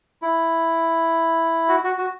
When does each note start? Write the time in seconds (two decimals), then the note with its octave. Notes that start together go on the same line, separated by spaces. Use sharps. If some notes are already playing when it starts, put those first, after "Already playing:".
0.22 E4
1.68 F#4
1.84 F#4
1.98 F#4